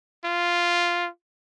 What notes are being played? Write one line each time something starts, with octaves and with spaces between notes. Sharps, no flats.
F4